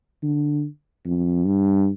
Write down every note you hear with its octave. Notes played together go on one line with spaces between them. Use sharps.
D3
F2
G2